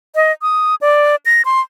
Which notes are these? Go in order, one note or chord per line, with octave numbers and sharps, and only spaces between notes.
D#5
D#6
D5
A#6
C6